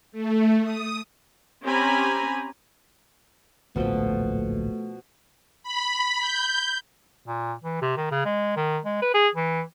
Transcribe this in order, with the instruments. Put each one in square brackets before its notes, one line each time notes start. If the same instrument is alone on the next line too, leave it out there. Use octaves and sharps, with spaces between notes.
[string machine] A3
D#6
[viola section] C4 C#4 G4 G#5 A#5 B5
[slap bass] D1 A#1 A#3 [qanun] B2 F3 G5 [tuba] A3
[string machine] B5
G6
[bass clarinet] A#2
E3
C3
D#3
C#3
G#3
D#3
G#3
B4
G#4
E3